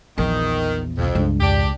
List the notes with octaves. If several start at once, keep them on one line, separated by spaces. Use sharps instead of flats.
A#1 E2 D#3
E1 C2 F2
C#2 G2 D4
F2 G#2 D4 G4